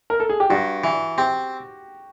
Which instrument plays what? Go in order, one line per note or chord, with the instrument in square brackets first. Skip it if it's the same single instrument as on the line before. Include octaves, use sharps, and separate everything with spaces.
[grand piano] A#4
A4
G#4
G4
[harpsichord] G2 [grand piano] F#4
[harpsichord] E3
[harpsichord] C4 [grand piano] G4